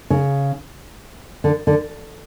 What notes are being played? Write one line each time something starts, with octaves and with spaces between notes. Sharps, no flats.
C#3
D3
D3